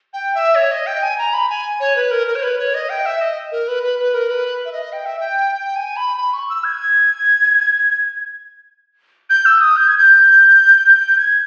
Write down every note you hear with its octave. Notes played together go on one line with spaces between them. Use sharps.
G5
E5
C#5
D#5
G5
G#5
A#5
B5
G#5
C#5
B4
A#4
A#4
C#5
B4
C#5
D#5
G5
E5
D#5
A#4
B4
B4
B4
A#4
B4
E5
D#5
G5
E5
G5
G5
G#5
B5
B5
C#6
E6
G#6
G6
E6
D#6
G6
G#6
G6
G#6